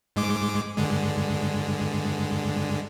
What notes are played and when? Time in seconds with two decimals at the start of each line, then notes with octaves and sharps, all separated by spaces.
0.16 G#2 G#3 D6
0.77 G2 D3 G#3